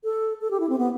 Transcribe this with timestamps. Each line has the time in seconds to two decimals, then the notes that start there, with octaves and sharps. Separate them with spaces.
0.04 A4
0.41 A4
0.51 G4
0.60 E4
0.69 C4
0.78 B3